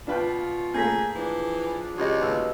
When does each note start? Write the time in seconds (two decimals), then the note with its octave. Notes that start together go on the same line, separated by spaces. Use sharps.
0.07 B2 D4 F4 B4 G5
0.74 A3 A#3 C#4 G#4 G6 A#6 B6
1.15 E3 F3 D4 G#4
1.98 C#2 F#4 G4 D#5
2.22 D#2 B4 D#5 E6